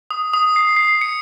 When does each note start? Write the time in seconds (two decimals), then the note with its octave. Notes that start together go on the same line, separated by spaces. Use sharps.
0.11 D#6
0.33 D#6
0.56 C7
0.76 C7
1.01 C#7